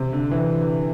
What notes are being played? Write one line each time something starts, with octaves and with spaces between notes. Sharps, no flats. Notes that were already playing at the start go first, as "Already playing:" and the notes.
Already playing: C3
D3
E3